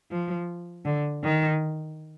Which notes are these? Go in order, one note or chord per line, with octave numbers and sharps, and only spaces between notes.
F3
D3
D#3